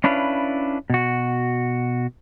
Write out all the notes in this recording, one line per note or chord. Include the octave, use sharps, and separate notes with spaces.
C#4 D4 E4 B4 F5
B2 F#4